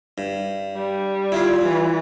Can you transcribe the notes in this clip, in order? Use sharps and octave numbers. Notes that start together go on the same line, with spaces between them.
G2
G3
E4 F4 G#4
E3